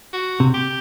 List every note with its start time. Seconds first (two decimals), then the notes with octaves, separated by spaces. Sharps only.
0.13 F#4
0.40 C3
0.54 G4